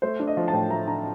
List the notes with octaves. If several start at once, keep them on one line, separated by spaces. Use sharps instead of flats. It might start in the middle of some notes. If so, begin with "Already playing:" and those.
A3 C5
D4
D#5
F3
A5
A2 G5
A3 A#5
D4 A#5